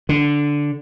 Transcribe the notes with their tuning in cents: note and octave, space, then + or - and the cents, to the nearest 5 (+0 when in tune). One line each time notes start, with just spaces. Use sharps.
D3 -5